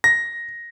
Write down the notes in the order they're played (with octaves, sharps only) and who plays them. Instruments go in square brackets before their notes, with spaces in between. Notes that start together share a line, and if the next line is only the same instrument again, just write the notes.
[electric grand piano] A#6